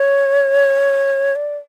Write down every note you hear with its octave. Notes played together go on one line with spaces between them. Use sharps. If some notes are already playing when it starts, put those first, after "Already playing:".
Already playing: C#5
D5